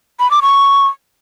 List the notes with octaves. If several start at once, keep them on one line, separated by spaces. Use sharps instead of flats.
B5
D6
C#6